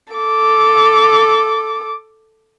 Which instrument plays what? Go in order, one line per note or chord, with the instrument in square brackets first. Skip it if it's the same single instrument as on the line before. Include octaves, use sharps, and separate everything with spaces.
[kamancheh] A4 D6